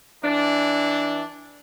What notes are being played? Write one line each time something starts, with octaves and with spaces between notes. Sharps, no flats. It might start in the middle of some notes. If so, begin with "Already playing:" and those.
E3 D4